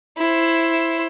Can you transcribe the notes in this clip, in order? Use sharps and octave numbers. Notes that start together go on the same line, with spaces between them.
E4 C5